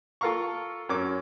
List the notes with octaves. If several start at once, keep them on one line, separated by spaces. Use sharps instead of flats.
F4 A4 A#4 F5 A#5 C#6
F#2 C#4 A#4 D6